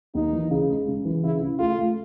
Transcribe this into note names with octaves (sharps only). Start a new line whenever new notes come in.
D#2 D#4
E3
C#3
G#3
C#3
E3
C#3 E4
C#3
A3 F4
A3